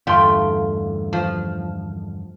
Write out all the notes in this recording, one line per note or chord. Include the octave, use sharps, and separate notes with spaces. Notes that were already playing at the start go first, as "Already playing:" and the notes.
E2 G2 D3 A3 F4 F5 G5 C6
F3